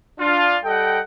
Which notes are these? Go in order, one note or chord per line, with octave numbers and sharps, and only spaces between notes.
D4 F4
G3 A4 D#5 F#5 G5